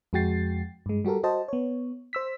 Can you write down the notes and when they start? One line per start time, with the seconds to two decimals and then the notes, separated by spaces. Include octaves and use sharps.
0.13 F2 G#3 F#4 G5 A6 C7
0.86 G2 G#3
1.05 G3 F#4 G4 A4 A#4
1.23 F#4 C5 D#5 A5
1.48 B3 C#5
2.13 C5 E6 B6